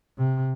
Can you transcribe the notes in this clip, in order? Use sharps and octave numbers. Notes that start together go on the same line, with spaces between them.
C3